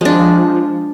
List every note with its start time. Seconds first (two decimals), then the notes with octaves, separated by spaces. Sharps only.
0.01 F3 G#3 D4